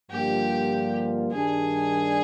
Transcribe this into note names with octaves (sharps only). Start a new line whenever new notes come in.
G2 D3 F3 A#3 F4 G4
G2 D#3 G3 D4 G#4